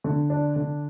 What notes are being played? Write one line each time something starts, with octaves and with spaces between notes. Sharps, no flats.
D3
D4
D3